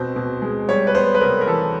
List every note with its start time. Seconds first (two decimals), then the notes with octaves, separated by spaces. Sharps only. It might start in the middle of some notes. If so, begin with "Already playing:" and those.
Already playing: B2 C4 C5
0.16 B2
0.42 G#3
0.69 G3 C#5
0.87 B4
0.95 B3 C5
1.15 B4
1.21 C3 A#4
1.41 A#4
1.47 E3 A4